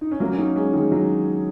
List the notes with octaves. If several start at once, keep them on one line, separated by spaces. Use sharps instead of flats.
D#4
C#4
F#3 A#3
C#4
A#3 D#4
G#3 C#4
D#3 G#3
F#3